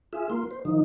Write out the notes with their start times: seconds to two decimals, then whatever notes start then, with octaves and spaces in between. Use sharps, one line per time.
0.13 F4 G#4 E5
0.30 A#3 F4 C6
0.51 C5
0.65 D#3 F3 D#4